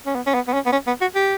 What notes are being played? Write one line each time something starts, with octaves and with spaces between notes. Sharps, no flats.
C#4
B3
C#4
B3
B3
C#4
B3
C#4
B3
F#4
G4